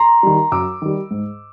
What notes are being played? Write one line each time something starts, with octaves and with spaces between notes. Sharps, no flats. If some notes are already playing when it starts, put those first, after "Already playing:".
Already playing: A#5 C6
D#3 G3
F#2 D6 E6
D#3 G3
G#2